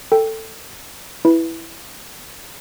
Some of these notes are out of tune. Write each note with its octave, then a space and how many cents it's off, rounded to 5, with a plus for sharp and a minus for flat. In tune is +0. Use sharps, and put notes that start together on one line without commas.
A4 +15 G5 +0
E4 +0 B4 +0